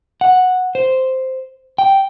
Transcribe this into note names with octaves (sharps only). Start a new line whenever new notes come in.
F#5
C5
G5